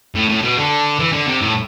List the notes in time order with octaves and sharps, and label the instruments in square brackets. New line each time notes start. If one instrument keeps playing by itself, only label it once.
[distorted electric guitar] A2
A2
B2
D3
E3
D3
C3
A2